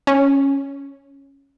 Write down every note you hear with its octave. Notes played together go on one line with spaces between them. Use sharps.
C#4